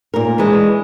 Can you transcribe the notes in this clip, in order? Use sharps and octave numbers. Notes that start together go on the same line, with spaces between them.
A#2 A#4
E3 G#3 D4